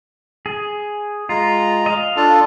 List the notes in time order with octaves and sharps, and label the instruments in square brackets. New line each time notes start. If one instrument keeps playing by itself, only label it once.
[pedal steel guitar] G#4
[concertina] G#3 A#5 [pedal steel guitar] F4
[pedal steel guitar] D#5 F5
[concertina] D4 F4 A4